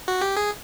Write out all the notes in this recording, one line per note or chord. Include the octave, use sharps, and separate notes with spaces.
F#4
G4
G#4